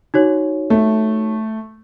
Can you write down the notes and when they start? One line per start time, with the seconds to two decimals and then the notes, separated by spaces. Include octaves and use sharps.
0.14 D#4 F#4 C#5
0.70 A3